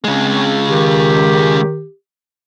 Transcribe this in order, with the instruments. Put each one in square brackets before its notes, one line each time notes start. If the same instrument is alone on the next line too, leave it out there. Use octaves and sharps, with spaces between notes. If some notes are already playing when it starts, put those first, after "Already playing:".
[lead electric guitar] C#3 G#3 [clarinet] C4
[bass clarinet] D#3 [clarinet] G4